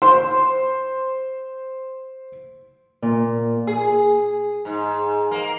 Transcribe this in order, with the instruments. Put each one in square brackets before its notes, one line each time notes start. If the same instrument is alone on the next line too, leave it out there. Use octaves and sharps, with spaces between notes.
[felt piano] C5 C6
[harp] A#2
[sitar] G#4
G#2
A#3